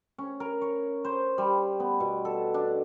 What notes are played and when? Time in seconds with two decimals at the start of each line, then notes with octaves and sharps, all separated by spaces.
0.18 C#4
0.40 A#4
0.61 C#5
1.05 C5
1.38 G3
1.80 B3
2.00 B2
2.25 A4
2.54 D4